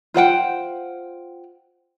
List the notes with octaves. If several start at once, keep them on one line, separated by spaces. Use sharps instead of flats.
F4 C5 F#5 G5